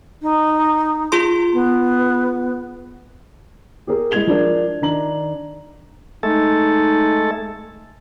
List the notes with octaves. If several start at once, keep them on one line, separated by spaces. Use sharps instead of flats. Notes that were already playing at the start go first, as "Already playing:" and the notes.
D#4
F4 G#4 C6
B3
G4 G#4 A#4
G#3 E4 G#4 G#6 F7 G7
F3 D4 A#4
D#3 D4 A#5 F#7
G#3 A3 D#4 A4